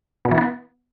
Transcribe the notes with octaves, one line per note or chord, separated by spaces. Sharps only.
B2
E3
B3